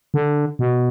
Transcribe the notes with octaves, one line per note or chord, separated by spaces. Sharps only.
D3
B2